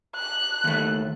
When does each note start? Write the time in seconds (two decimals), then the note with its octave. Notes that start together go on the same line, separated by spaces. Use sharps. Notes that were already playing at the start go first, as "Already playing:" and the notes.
0.15 F#6
0.64 D#2 A3